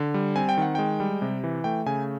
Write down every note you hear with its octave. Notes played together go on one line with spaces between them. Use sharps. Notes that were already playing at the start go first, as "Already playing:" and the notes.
Already playing: D3
G3
C4 G#5
G5
D#3 F#5
G#3 G5
G3
C3
E3
A3 G5
C#3 G#5